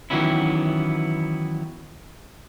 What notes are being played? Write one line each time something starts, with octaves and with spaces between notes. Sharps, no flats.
D#3 E3 F#3 B3 C#4 E4